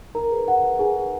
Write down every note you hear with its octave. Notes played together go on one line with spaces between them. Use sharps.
D#4 A#4 A#5
G#4 B4
D#4 F#5
G#4 B4
D#4 G#4 G#5
G#4 B4